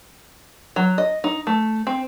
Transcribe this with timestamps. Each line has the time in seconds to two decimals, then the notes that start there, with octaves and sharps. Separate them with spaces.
0.76 F#3
0.98 D#5
1.24 D#4
1.47 A3
1.87 C4